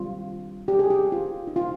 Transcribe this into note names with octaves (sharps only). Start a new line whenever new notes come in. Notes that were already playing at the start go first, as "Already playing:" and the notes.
Already playing: D#3 G3 C4 F4
G4
G#4
G4
F4
D#4
F4